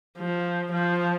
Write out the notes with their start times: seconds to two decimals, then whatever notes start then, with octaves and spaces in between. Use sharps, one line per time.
0.18 F3
0.72 F3